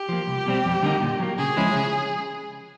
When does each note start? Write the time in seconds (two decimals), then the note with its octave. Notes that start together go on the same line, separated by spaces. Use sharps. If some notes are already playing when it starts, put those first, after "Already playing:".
Already playing: G4
0.09 F3 A#3
0.27 C2
0.46 B2 G3 C4
0.65 F2
0.83 D3 G3 A#3 D#4
1.02 A#2
1.20 F#3 A#3
1.38 C#3 G#4
1.57 F3 G#3 C#4 E4
1.75 C#3